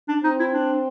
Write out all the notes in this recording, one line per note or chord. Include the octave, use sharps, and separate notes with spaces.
D4
C4 D#4
E4
D4